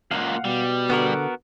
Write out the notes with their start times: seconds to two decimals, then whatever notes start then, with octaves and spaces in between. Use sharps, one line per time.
0.11 C#2 A#2 F5 F#5
0.45 B2 G3
0.90 D3 B3 F#4 A#4